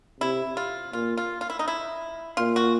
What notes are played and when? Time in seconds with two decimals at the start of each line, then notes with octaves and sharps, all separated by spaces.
0.20 C3 E4
0.57 F4
0.93 A#2 F4
1.17 F4
1.41 F4
1.50 E4
1.59 D#4
1.68 E4
2.37 A#2 F4
2.56 F#4